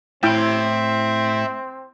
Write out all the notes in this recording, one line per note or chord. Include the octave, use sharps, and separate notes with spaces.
A2 C4 E4 E5 G5 C6